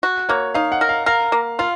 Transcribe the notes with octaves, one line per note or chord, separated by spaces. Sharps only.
F#4
A#3 C#5
D#4 F5
F#5
A#4
F5
A#4 F5
A#3
F4 F5